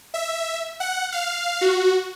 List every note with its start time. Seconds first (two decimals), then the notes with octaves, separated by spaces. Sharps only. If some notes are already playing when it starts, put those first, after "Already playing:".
0.14 E5
0.80 F#5
1.12 F5
1.61 F#4